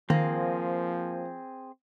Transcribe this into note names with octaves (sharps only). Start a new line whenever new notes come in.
D#3 F3 A#3 C4 G#4